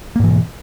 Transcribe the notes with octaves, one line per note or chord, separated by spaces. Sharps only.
G#2 B2 E3 A#3